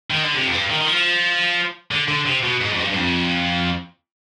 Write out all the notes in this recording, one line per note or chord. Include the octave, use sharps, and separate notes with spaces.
D#3
D3
C3
F2
G2
D#3
D#3
F3
D3
D3
C3
B2
G#2
F2
G2
G2
F2